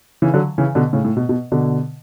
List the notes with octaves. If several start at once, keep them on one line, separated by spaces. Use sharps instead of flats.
C#3 E3
D3 F#3
C#3 E3
B2 D3
A2 C#3
A2
B2
B2
B2 D3